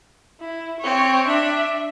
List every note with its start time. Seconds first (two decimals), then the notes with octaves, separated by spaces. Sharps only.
0.41 E4
0.80 C4 C#5
1.26 D4 E5